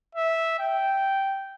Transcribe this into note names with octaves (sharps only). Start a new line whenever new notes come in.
E5
G5